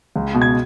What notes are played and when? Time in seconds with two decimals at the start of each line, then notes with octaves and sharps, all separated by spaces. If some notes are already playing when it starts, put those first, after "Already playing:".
0.16 C#2
0.34 B2
0.42 G#6